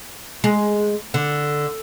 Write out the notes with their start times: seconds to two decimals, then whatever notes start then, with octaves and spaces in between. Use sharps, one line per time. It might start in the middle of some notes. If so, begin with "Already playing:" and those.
0.44 G#3
1.14 D3